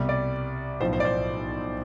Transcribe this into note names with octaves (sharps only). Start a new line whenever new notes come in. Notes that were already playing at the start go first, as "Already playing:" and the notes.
Already playing: C2 B2 G3
D5
B1 A2 F3 C5
C5
D5
C5